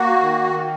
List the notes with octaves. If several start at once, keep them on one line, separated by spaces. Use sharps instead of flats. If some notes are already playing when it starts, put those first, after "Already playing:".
Already playing: A#3 F#4
D#3